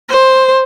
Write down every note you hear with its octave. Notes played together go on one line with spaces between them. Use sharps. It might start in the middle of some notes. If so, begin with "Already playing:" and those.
C5